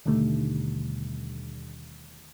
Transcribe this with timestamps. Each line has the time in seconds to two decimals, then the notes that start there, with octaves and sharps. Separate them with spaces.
0.05 D#2 B2 D3 D#3 G3 A3